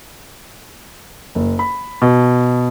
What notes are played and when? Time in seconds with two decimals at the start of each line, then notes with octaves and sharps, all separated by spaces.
1.35 F#1
1.59 B5
2.02 B2